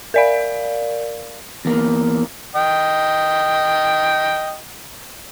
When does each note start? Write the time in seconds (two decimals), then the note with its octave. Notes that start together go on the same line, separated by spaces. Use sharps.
0.14 A#4 D5 F5
1.65 E2 A#3
2.55 D#5 G5